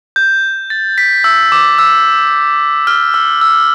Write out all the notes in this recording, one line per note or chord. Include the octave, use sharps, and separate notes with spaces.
G6
A6
B6
E6
D6
E6
F6
E6
E6